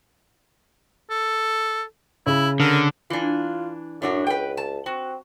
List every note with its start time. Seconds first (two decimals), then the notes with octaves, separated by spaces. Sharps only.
1.10 A4
2.27 C#3 E4
2.60 D3 A#4
3.10 E3 D4 F4
4.02 F#2 A2 D4 F#4
4.27 C#2 B4 G5
4.57 A5
4.86 C4 F#4